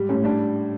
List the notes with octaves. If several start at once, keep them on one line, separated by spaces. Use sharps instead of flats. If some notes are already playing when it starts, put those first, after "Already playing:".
Already playing: G#2 G3
A2 C#4
G3 D4